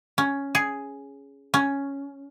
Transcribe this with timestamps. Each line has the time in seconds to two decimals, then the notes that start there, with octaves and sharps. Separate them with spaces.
0.18 C#4
0.55 G#4
1.54 C#4